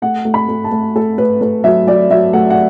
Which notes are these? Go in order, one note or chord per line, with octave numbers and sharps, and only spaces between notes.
A3 F#5
A3
B5
A3
A5
A3
A3 A4
A3 B4
A3 B4
F#3 E5
F#3 D5
F#3 E5
A3 F#5
F#5